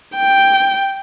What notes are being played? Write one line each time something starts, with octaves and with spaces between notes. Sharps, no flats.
G5